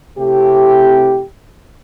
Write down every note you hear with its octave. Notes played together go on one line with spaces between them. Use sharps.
C3 A3 C4 E4 G4